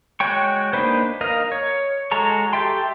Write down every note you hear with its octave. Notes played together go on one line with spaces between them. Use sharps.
G#3 F#4 C#5 G5 C#6
A#3 D4 D#4 B4 C5
A#4 D#5 F5
C#5
G#3 F#4 A4 A#5 C#6
G4 A4 E5 G5 C6